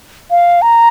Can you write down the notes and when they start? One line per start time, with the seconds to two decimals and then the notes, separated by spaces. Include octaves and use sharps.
0.31 F5
0.62 A#5